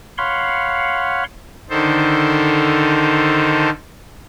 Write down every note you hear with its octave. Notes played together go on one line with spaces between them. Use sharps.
C#5 F5 F#5 B5 C6
D3 D#3 D#4 A4 C5